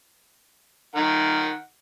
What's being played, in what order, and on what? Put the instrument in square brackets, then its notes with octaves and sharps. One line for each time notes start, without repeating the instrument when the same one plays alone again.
[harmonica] D#3 A#4 F#5